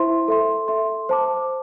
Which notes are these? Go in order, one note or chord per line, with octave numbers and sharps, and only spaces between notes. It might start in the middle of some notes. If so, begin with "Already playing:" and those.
Already playing: E4 C5 E5 C6
A4 E5 C6
A4 E5 C6
C5 A5 D6